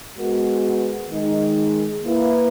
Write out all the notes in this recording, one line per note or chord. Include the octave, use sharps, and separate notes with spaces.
G#3 B3 F#4 A#4
D#3 G#3 D#4
A#3 E4 B4